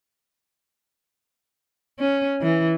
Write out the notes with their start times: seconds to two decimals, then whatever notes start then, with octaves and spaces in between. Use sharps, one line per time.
1.99 C#4
2.41 E3